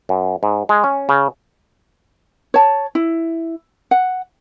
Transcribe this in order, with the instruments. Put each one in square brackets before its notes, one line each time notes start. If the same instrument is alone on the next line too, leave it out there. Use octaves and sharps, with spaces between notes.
[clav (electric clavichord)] F#2
G#2
G#3
C#4
C#3
[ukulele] C#5 A5
E4
F#5